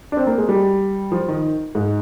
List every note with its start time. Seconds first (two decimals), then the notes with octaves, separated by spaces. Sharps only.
0.12 D4
0.17 C4
0.27 A#3
0.38 G#3
0.49 G3
1.12 F3
1.28 D#3
1.75 G#2